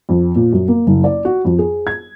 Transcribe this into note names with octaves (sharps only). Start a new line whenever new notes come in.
F2
A#2
F#2
A#3
F#1
D5
F#4
F2
G#4
G#6